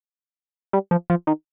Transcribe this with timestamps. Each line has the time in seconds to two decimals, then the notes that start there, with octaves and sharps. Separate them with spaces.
0.73 G3
0.91 F3
1.10 F3
1.27 D#3